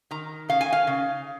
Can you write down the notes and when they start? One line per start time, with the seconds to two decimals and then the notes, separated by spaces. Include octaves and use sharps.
0.11 D#3 A#5
0.49 C#3 F5
0.61 G#5
0.73 F5
0.87 C#3